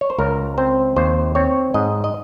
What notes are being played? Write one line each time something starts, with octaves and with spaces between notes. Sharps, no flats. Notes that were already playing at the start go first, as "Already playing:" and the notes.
C#5
C5
C#2 A#4
C4 C5
D#2 C5
C4 C#5
G#2 D#5
D#5